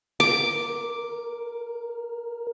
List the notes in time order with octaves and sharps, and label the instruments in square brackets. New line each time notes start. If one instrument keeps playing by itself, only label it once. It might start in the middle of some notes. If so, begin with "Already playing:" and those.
[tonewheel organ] A#4 [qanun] D6